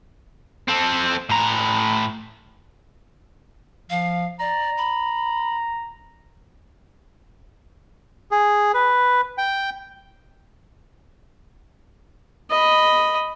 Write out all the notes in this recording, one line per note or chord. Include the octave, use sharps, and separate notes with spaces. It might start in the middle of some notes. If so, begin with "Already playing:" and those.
C4 A4
A2 A#5
F3 F5
D5 A#5
B5
G#4
B4
G5
D#5 B5